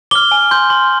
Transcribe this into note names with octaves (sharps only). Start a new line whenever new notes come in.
D6 F6 G7
G#5
C6 G6
C6